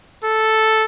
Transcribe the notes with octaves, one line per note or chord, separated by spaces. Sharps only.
A4